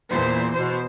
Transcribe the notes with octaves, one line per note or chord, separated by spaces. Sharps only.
E2 A#2 E3 C5
B2 C5